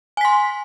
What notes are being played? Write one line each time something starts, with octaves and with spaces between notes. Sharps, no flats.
G#5 C6 B6